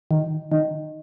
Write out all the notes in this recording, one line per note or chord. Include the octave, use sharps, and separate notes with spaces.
D#3
D#3